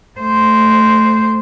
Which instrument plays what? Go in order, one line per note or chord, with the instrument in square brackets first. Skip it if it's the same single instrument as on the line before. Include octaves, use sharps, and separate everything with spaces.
[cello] A3 C5